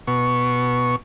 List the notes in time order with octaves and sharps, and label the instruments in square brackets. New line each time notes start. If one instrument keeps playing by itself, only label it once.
[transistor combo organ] B2 C#6